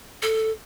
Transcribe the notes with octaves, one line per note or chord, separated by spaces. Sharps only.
A4